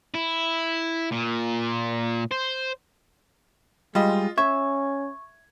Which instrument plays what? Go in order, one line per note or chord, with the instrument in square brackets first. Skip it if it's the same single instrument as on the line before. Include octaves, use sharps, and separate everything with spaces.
[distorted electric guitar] E4
A#2
C5
[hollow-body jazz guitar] G3 [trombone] G#3 [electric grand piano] F4 D#5
[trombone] C#4 [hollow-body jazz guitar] E5 [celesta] C#6 [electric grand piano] G#6